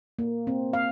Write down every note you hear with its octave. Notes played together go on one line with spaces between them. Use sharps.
A#3
C4
F5